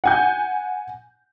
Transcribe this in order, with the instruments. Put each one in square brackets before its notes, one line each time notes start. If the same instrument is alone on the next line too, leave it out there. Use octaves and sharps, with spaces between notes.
[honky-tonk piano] F#5 G#5 G6